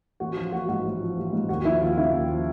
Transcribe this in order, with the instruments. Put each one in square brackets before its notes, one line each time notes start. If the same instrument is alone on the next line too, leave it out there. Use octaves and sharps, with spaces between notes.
[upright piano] A1 F#4
F3 F4
A1 F#4
G#2 F#4
A1
F3
A1
G#2
D#2 F#4
F3 E4
D#2 F4
C#3 E4
D#2
F3